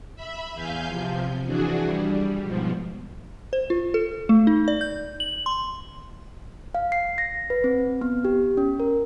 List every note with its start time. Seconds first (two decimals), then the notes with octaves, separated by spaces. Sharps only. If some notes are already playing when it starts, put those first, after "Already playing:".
0.16 E5 B5
0.54 E2 F5 G#5 G6
0.88 C3 F3
1.45 E3 D4 F#4 G#4
1.81 G3
2.42 G#2 B2 F3
3.53 C5
3.70 F4
3.94 A4
4.29 A3
4.47 D#4
4.68 D5
4.81 G6
5.20 F#7
5.46 C6
6.75 F5
6.92 C7
7.18 A#6
7.50 B4
7.64 C4
8.01 B3
8.25 G4
8.57 C#4
8.80 A#4